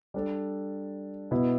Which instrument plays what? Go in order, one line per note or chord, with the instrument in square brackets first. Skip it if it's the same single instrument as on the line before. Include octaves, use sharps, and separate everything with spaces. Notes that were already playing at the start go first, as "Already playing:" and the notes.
[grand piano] G3 D4 A4
B2 B3 E4 B4